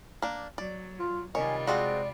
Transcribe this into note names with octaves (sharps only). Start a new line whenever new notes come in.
A#3 D4
F#3 D5
F4
C3 D#3 G3 F4 C#5 G#5
F3 G#3 C4 F#4 D5